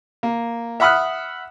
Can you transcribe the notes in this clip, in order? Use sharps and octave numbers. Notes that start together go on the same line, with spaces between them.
A#3
E5 F#5 B5 D#6 F6 F#6